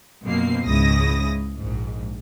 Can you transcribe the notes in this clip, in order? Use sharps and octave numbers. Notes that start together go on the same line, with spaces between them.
F#2 B2 F3 A#3 C4 C7
C#2 G#2 C#3 E4 D#6 A#6
A#1 G#2